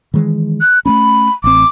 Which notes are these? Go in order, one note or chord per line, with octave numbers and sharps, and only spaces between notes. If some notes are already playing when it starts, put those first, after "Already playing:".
D#3 E3 G#3
F#6
A3 B3 C#4 B5
A1 C4 D6